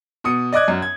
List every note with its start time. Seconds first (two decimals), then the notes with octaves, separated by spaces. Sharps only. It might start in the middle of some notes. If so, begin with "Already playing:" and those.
0.24 B2 D#6 C#7
0.53 D5 D#5 D6 F#6 G#6
0.68 F#2
0.82 G#6